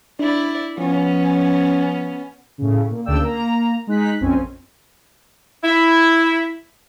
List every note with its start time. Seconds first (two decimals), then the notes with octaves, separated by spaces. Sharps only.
0.19 D4 E4 D5
0.78 F3 B3 C#4
2.58 A2 C#3
2.90 A#2
3.06 D2 C#3 D4 D5 G5 E6
3.21 A#3 A#5
3.87 G#3 D#4 F#6 B6
4.21 A#1 F2 C4 C#4 G#5
5.64 E4